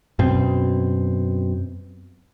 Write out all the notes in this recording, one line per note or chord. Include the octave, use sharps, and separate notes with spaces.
F#2 B2 C4